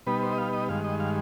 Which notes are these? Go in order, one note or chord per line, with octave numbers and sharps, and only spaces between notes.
B2 G3 B3 D#4 B4
C5
D#5
F5
D#5
G2 D#3 G#3 F5
D#5
F5